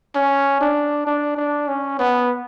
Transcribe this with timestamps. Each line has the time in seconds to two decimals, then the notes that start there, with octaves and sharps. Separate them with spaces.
0.15 C#4
0.61 D4
1.07 D4
1.37 D4
1.68 C#4
1.99 B3